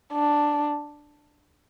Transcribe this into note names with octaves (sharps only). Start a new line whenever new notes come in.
D4